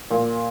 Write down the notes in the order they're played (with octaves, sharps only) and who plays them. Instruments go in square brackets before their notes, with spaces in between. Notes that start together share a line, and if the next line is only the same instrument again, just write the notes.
[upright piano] A#2 A#3